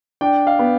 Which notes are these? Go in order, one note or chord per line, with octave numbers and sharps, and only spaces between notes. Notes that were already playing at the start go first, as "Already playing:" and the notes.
D4 G5
F5
B3